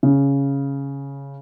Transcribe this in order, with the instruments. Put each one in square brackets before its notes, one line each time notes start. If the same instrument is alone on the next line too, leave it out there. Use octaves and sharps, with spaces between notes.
[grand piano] C#3